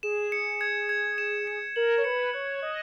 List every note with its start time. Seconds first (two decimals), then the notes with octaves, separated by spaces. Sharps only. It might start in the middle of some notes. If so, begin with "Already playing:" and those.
0.03 G#4 E7
0.32 C#7
0.61 G#6
0.89 G#6
1.18 E7
1.47 C#7
1.76 A#4 F#7
1.97 C#5
2.04 B4 C#7
2.34 C#5 F#6
2.62 D#5 F#6